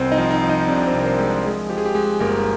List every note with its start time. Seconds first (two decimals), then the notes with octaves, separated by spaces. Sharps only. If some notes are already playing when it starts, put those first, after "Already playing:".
Already playing: C2 C4 C5
0.12 D#4 D#5
0.18 F3
0.30 D#4 D#5
0.43 F3
0.49 D#4 D#5
0.68 C3 D4 D5
0.87 C4 C5
0.94 C2
1.00 A#4
1.06 C4 C5
1.19 G#3
1.44 F3 G#3 G#4
1.69 F3 G4
1.78 G#4
1.86 G4
1.95 G#3 G#4
2.20 G1 A#3 A#4